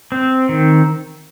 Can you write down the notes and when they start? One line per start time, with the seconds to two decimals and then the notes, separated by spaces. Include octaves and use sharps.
0.12 C4
0.49 D#3